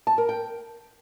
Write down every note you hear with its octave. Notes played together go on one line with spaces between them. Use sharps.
A5
A#4
G5